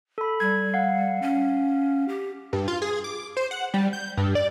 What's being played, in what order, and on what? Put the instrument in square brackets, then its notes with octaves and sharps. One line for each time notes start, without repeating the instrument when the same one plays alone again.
[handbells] A4 B5
[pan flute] G3 [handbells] G#6
[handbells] F5 F#5
[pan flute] C#4
G4
[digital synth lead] G2
F4
G#4
D6
C5
F#5
G3
G6
G2
D5